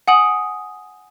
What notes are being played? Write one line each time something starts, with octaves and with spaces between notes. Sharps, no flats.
F#5 G#5 D#6 D7 F#7